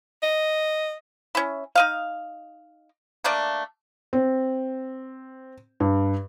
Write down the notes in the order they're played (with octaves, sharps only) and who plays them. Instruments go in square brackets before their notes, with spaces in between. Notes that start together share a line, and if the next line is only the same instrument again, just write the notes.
[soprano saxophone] D#5
[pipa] C#4 E4
D#4 D#5 F5
A3 A#3 D4 D5
[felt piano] C4
G2